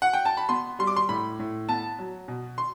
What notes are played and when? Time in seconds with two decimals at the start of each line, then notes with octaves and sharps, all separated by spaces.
0.02 F#5
0.13 G5
0.25 A5
0.37 B5
0.49 B3 C6
0.79 G3 C6
0.87 D6
0.96 C6
1.09 A2 B5
1.40 A2
1.68 B3 A5
1.99 F#3
2.28 B2
2.58 C6